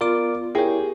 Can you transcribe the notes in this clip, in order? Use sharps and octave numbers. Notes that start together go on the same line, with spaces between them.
B3 F4 A#4 D5 D6
E4 G4 G#4 A#4 C#5 G5